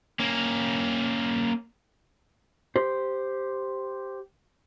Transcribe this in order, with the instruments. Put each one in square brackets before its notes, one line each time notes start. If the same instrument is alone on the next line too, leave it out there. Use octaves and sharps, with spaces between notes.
[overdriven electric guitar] A#3 C#4
[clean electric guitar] G4 C5